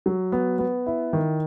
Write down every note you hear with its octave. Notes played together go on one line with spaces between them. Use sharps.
F#3
B3
B3
E4
D#3